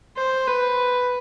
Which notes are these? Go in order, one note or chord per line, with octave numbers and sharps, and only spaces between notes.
C5
B4